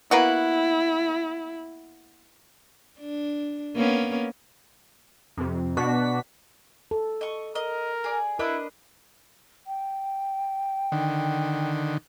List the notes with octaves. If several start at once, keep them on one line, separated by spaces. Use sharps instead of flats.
A#3 B3 E4 F#4
D4
A#3 B3 C#4
F2 C3
B2 D4 F#4 B6
A4
D#5 C#6
A#4 D#5
G#4 D5
D4 E4 A#4 B4 D#5
G5
D3 D#3